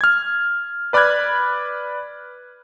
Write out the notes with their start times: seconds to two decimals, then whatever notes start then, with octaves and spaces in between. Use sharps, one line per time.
0.01 F6 G#6
0.93 B4 D5 B5 F6 F#6 G#6